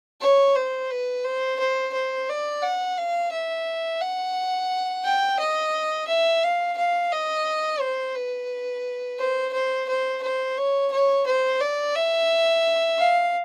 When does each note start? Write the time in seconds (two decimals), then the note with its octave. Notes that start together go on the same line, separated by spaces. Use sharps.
0.21 C#5
0.56 C5
0.90 B4
1.24 C5
1.59 C5
1.94 C5
2.29 D5
2.62 F#5
2.98 F5
3.32 E5
4.01 F#5
5.05 G5
5.39 D#5
6.08 E5
6.43 F5
6.77 F5
7.12 D#5
7.80 C5
8.15 B4
9.19 C5
9.53 C5
9.88 C5
10.23 C5
10.58 C#5
10.92 C#5
11.26 C5
11.61 D5
11.95 E5
12.99 F5